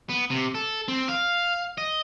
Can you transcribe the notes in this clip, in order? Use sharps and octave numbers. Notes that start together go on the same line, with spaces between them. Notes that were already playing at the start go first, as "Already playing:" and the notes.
B3
C3
A4
C4
F5
D#5